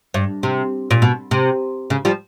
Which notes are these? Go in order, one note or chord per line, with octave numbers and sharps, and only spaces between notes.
G2
C3
A#2
B2
C3
C#3
F3 G3